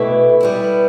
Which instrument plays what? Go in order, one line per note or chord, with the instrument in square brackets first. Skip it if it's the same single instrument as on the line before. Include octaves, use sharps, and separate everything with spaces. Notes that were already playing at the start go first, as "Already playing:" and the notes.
Already playing: [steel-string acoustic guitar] B2 A3 E4 G4 B4
G3 B3 E4